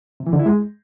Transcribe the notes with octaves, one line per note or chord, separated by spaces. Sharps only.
C3
E3
D3
E4
G#3